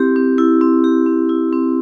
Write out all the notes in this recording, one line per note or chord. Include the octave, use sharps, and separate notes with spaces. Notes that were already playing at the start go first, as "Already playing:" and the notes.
Already playing: C4 E4 G4
C4
E4
C4
G4
C4
E4
C4